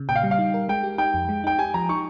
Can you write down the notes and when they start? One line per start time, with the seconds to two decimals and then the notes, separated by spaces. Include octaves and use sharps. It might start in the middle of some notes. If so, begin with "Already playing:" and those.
Already playing: C#3
0.09 A#2 G5
0.16 F5
0.23 G3
0.31 F5
0.39 D#4
0.54 A#4
0.69 G#3 G5
0.84 G4
0.98 D#4 G5
1.14 F2
1.29 G#3
1.44 D#4 G5
1.59 G4 G#5
1.74 F3 A#5
1.89 D#4 C#6